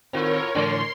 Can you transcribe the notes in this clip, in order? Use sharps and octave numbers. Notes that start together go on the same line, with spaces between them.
A2 D#3 C4 F4 A#4 C#5
A2 D3 E3 C#4 D5 C6